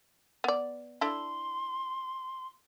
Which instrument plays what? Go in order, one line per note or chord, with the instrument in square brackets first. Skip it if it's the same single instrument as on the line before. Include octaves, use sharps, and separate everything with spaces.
[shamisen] B3 D5
[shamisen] D4 E4 A4 [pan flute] C6